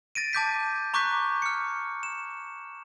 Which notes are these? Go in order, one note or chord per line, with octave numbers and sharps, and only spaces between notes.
A6 A#6 D7 D#7
A5 D6 G6 B6
A#5 C#6 D6 F#6 G6 B6
F6 C#7
E7